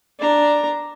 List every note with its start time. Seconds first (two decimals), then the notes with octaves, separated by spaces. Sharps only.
0.19 D4 A#5